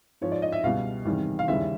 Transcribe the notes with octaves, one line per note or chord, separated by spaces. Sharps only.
G#2 F3 C#5
D5
D#5
E5
C#2 B2 G3 F5
E2 C3 D#3 G3
F5
D#2 C#3 E3 G3 E5